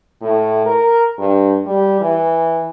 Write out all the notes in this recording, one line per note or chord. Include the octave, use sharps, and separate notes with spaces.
A2
A#4
G2
G3
E3